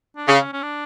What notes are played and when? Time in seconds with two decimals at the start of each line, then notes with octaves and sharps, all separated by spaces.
0.17 D4
0.28 C#3
0.40 C#4
0.53 C#4
0.63 D4